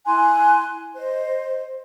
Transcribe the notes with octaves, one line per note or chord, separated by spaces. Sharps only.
E4 G#5 C6 F#6
C5 D#5